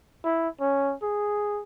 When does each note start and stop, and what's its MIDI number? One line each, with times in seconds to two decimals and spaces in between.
0.24 0.49 64
0.61 0.94 61
1.02 1.62 68